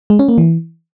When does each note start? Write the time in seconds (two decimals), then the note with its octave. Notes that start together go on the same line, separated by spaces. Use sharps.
0.10 G#3
0.19 C#4
0.29 A#3
0.38 E3